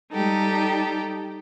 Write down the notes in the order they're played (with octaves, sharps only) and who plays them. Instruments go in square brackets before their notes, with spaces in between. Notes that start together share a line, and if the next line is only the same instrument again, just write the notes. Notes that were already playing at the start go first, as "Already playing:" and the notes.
[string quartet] G3 D#4 G4 A4